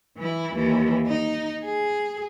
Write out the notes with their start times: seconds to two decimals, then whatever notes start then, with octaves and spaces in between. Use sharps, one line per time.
0.17 E3 E4
0.54 D#2 E3
1.07 D#4
1.64 G#4